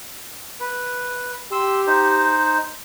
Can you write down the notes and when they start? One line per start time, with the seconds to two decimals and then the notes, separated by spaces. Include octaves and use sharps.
0.60 B4
1.52 G4 C6 E6
1.87 D#4 C5